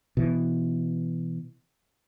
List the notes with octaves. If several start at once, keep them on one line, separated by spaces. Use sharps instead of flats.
B2 E3